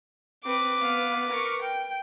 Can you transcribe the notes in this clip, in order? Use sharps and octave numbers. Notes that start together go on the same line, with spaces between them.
C4 B4 D6
B3 F5
A#4 C#6
G5